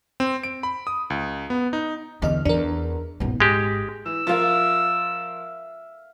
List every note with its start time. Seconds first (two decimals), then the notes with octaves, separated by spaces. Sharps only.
0.20 C4
0.43 D7
0.63 B5
0.87 D#6
1.10 C#2
1.50 B3
1.73 D#4
2.22 E2 D3 D#5 F6
2.45 E2 D4 A#4
3.20 D#1 B1 G2 B3
3.40 G#1 G#2 G#3 G4
4.06 E3 E6
4.27 F3 F4 A#4 E5 F5